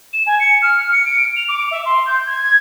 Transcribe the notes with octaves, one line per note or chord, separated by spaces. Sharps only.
E7
G#5
C#7
F6
C#7
D7
F7
D6
E5
C6
G6
G#6